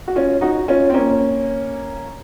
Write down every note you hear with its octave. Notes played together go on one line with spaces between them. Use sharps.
F#4
C#4 F4
D#4 F#4
C#4 F4
C4
A#3 C#4